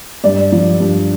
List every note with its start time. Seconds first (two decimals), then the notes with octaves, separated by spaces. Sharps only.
0.24 G2 D5
0.52 F3
0.80 G2